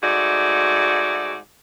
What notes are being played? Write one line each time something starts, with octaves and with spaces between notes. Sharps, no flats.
G#2 A3 F#4 D5